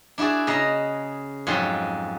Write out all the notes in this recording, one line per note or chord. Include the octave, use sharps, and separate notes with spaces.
D4 E4 F#4 G#4 D5
C#3 D#5 A#5
F2 G#2 F#3 C#4 C6